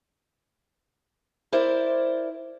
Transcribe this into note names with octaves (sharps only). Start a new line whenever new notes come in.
E4 A#4 C5 D5